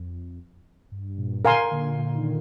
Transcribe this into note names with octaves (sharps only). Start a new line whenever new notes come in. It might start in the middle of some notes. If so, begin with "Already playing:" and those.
Already playing: F2
G2
G2 A#2
A#2 D3 A#4 F5 G#5 C6
A#2 D3
A#2 D3
D#3
A#2 D3